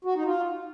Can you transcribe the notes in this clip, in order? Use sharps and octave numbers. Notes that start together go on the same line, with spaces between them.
F#4
D#4
F4